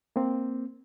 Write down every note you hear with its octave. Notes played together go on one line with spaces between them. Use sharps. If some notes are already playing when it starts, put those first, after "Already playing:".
A#3 C4